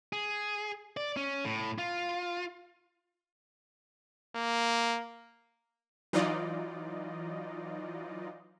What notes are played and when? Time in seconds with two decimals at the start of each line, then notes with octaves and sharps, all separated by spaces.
0.13 G#4
0.97 D5
1.17 C#4
1.45 A2
1.78 F4
4.36 A#3
6.13 E3 F#3 D#4 F4 D5 D#5